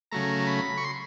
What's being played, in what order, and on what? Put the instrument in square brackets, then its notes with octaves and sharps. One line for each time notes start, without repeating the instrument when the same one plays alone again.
[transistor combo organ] C#3 F#3 A3 A#5
B5
C#6
C6